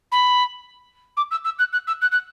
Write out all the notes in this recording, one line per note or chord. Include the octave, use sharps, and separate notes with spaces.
B5
D6
E6
E6
F#6
F#6
E6
F#6
F#6